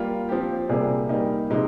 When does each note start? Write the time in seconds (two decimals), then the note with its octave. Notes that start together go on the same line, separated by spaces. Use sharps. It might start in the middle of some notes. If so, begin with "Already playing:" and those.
Already playing: G3 A#3 F4
0.29 F3 C4 G4
0.69 C3 G3 A#3 D4 G#4
1.09 G3 A#3 D#4
1.50 C3 F3 G#3 D#4